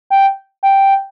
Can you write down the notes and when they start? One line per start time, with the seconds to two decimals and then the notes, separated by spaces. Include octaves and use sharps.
0.10 G5
0.63 G5